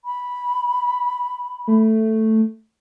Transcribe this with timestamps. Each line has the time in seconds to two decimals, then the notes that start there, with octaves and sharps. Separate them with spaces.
0.05 B5
1.68 A3